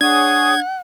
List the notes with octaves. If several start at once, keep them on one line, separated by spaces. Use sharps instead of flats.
D4 G#4 C#5 F#5 D#6 G#6